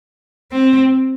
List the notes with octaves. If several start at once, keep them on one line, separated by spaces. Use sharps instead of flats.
C4